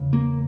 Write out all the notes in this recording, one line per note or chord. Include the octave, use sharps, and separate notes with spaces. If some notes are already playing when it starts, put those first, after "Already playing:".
Already playing: E2 C#3
A#3